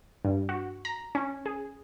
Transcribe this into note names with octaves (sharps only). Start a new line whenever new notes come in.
G2
F#4
A#5
C#4
G#4